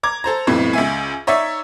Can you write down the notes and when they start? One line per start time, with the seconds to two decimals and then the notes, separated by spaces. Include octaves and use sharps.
0.03 A#5 D6 G#6
0.24 A4 C5 A#5
0.47 B1 F2 A2 C3 E3
0.73 C#2 E5 G#5
1.27 D#4 C#5 D5 E5